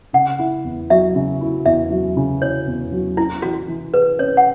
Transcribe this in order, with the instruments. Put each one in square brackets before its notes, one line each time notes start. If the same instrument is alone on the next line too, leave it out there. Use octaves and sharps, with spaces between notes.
[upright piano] C#3 [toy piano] F#5
[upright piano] E4
E2
[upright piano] F#3 [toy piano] E5
[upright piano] C#3
E4
[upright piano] E2 [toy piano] E5
[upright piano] F#3
C#3
[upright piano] E4 [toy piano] C#5
[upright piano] E2
F#3
[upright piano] C#4 [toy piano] E4
[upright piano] E3 [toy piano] F#4
[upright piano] E3
[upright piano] G#4 [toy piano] B4
[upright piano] C#4 [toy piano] C#5
[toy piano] F#5